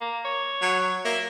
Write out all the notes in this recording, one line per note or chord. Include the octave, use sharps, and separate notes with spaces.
A#3
C#5
F#3
A#3 E5